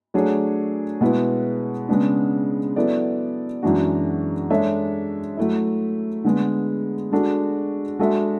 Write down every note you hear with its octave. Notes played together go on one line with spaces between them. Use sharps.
F#3 A3 D4 G#4 C#5
B2 G#3 B3 E4 B4
C#3 G#3 B3 D4
F#3 B3 E4 A4 D5
F#2 E3 G#3 D4 F#4
G#3 D4 A4 C#5 E5
F#3 A3 E4
D3 G#3 B3
G#3 D4 F#4 A4
G#3 D4 F#4 A4 E5